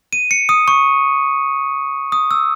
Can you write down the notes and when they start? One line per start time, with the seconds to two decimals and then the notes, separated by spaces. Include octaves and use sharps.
0.13 D#7
0.31 C#7
0.49 D#6
0.68 C#6
2.12 D#6
2.31 E6